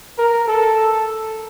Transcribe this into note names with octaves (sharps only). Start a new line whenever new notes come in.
A#4
A4